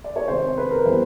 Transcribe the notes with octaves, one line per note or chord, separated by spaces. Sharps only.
D5
C#5
C3 D#3 G#3 C4 C5
B4
A#4
E3 G3 B3 C5